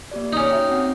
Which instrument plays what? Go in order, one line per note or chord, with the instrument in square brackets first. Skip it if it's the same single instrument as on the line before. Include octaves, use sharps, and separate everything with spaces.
[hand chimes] A#3 G4 D5
[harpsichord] C#4 D#4
[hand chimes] F#4 E5 G5
C4 F#4 F#5